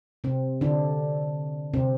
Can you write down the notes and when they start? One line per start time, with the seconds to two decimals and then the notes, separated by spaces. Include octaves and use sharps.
0.24 C3 C4
0.61 D3 D4
1.74 C3 C4